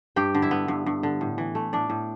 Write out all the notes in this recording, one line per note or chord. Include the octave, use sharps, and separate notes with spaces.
G2 G4 G5
D3
E4 E5
B3
G2
G2
D3
A2
E3
A3
A2 D4 D5
A2